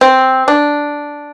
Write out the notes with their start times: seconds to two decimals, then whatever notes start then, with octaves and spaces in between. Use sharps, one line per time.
0.01 C4
0.48 D4